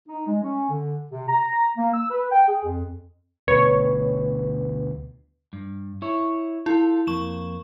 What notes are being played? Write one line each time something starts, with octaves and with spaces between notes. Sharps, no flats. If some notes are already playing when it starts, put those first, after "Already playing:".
D#4
G#3
C#4
D3
C3
A#5
A#3
E6
B4
G5
G#4
F2
D2 B2 B4 C#5
G2
E4 C#5
E4 F4 A4
F2 A#3 C#6 E7